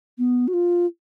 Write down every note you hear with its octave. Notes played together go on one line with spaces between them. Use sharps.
B3
F#4
F4